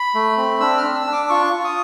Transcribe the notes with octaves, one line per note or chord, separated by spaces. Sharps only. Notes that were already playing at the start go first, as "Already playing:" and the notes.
Already playing: B5
A3
C4
D4 E6
F6
D4
E6
D4
D6
F4 C#6
F4
D#6